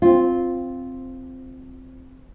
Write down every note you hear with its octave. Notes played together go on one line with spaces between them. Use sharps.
C4 F4